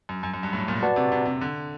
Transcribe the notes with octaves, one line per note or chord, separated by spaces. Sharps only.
F#2
F#2
F#2
G2
A2
A#2
F#4 B4 D5 F#5 A5
C3
C3
C3
D3